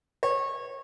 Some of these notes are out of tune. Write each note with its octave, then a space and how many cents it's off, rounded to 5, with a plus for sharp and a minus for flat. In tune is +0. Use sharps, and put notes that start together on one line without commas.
C#5 -20